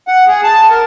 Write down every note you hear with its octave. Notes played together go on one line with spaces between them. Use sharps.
F#5
G#4
A5
A#4